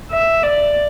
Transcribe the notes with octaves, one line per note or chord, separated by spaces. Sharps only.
E5
D5